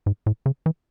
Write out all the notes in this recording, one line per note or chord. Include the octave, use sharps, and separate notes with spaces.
G#2
A2
C#3
E3